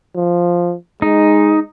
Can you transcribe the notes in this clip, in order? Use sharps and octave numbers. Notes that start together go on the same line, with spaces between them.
F3
G#3 D#4